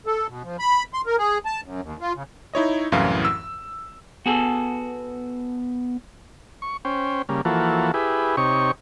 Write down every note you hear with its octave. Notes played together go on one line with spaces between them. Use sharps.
A4
B2
F3
B5
C6
A#4
G#4
A5
F#2
D#2
F4
C#3
D#4 E4 C#5 D#5
C2 F#2 A2 E3 F5
E6
B3 F#4 G#4 A4
C#6
C#4 C5 G5
C#3 G3 A#3
E3 F3 A#3 F#4 A4
E4 G4 G#4 B4
C3 D#4 G4 C#5 C#6